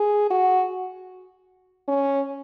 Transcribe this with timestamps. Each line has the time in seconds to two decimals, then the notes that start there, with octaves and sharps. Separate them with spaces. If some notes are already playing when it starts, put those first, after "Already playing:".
Already playing: G#4
0.30 F#4
1.88 C#4